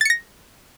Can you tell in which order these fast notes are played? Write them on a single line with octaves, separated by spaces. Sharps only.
A6 C#7 A#6